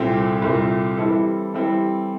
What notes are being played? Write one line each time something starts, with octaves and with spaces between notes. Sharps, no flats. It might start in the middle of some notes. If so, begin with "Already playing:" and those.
Already playing: C2 A#2 A3 C4
C2 A#2 A3 C4
E3 G3 C4 E4 A4
E3 G3 C4 E4 A4